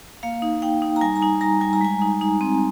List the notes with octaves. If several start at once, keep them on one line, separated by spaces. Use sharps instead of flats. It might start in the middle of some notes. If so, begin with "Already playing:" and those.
A#3 F5
D#4
D#4 G5
D#4
A#5
G3 G#5
A#5
D#4 G#5
G3 A#5
G3 G#5
A#5
G#3 G#5
D#4
D#4
C4